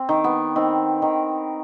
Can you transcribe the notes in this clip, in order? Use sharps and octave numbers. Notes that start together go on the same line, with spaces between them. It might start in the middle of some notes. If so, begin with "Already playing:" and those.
Already playing: C4
D#3
B3
D#3 C4
D#3